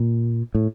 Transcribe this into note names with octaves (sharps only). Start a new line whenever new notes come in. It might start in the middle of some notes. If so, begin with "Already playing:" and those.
Already playing: A#2
A2